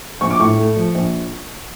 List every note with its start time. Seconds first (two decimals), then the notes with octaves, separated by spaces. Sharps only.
0.21 A#1 C#6
0.31 D6
0.39 A2 C#6
0.58 A3
0.76 F3
0.95 A#1